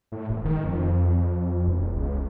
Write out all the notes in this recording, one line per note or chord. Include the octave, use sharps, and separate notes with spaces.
A2
E1
D#3
F2
E1
C#2